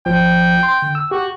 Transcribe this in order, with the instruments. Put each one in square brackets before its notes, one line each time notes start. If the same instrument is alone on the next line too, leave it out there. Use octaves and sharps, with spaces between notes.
[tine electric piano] G#1 F3 [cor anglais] G5
[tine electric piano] C6
D3
E6
[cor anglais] F#4 [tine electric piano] G4